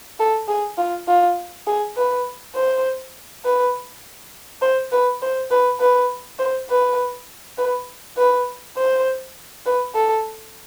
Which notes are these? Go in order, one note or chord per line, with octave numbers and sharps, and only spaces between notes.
A4
G#4
F4
F4
G#4
B4
C5
B4
C5
B4
C5
B4
B4
C5
B4
B4
B4
C5
B4
A4